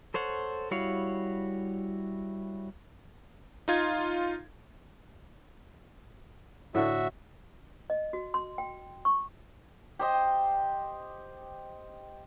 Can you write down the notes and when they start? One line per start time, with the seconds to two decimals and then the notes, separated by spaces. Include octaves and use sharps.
0.14 A4 C5 C#5 F#5
0.71 G3 E4 F#4 C#5 F5
3.68 D#4 F4 G#6
6.75 A2 D3 F#4 E5
7.90 D#5
8.13 F#4
8.34 C6
8.58 G5
9.05 C#6
9.99 G4 C5 D#5